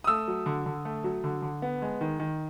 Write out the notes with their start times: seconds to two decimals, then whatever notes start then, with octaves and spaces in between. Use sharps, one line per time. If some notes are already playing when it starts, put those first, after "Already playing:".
0.04 D#6
0.07 A3 E6
0.28 F#3
0.46 D3
0.66 D3
0.85 A3
1.04 F#3
1.24 D3
1.42 D3
1.62 B3
1.82 G#3
2.01 D#3
2.20 D#3